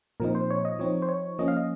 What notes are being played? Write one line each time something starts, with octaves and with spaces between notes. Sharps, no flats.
A#2 F3 C4 D#4 A#4
C5
C#5
D#5
F3 C4 D#4 C#5
C5
C#5
F3 A#3 C#4 D#5
F5
D#5